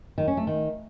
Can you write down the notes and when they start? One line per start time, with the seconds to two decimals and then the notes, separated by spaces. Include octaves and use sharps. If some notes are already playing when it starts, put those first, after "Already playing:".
0.18 D#3
0.27 C#4
0.37 A3
0.47 D#3